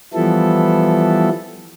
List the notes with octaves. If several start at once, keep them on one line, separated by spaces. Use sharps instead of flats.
E3 F3 G3 B3 E4 A4